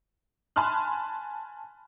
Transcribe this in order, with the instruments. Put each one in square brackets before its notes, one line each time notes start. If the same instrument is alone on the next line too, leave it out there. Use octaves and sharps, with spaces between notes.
[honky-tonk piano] G#5 A5 B5 C6 F6 F#6